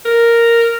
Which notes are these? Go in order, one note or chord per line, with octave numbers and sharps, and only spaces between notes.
A#4